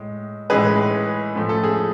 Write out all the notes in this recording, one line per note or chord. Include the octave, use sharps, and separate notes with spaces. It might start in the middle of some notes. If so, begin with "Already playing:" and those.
Already playing: A2 G#3
A2 E3 G#3 G#4 B4
A2 F3 A3
A4
G#4